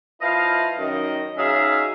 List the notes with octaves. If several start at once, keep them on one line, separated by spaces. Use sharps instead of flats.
F3 E4 B4 D#5 F5
F#2 D#3 D#5
F#3 C#4 D#4 G#4 E5 F5